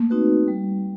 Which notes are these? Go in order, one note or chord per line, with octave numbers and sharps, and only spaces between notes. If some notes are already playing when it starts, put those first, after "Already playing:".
Already playing: A3 A#3
C4 D#4 F#4 B4
G3